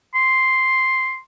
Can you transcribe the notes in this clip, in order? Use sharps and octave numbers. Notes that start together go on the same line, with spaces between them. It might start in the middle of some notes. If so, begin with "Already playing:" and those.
C6